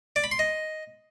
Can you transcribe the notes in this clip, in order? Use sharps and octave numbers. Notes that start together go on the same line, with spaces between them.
D5
B5
C6
D#5